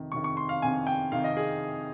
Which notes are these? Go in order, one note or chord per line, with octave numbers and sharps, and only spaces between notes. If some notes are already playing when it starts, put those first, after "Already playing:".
Already playing: F2 C3 D#3
F2 C3 D#3 C#6
C#6
C6
F5
F2 C3 D#3 G#5
G5
F2 C3 D#3 F5
D#5
G#4